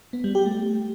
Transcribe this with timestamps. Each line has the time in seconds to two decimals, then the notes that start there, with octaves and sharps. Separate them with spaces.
0.13 B3
0.24 G3
0.35 G4
0.46 A3